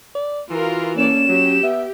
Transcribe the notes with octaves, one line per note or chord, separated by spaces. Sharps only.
D5
E3 F4 F#4 A#4
A#3 C#4 A4 D5 E7
F#3 G4
B3 E5